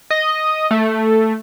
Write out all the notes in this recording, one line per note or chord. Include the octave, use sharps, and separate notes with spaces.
D#5
A3